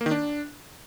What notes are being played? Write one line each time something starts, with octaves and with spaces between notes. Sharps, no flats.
A#3
D#3
D4